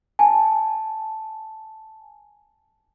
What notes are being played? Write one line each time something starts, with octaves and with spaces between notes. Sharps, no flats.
G#5 A5